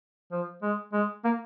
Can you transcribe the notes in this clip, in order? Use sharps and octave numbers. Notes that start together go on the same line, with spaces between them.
F3
G#3
G#3
A#3